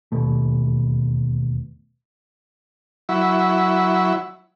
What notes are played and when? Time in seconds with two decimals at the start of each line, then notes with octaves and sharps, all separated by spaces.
0.12 E1 D#2 B2 A3
3.09 F#3 E4